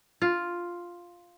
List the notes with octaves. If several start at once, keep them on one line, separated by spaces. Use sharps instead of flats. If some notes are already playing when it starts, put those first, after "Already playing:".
F4